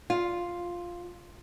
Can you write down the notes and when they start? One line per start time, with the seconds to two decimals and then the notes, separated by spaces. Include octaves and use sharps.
0.10 F4